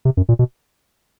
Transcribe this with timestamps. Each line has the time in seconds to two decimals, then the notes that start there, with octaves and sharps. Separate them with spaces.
0.05 C3
0.17 F#2
0.29 A#2
0.39 B2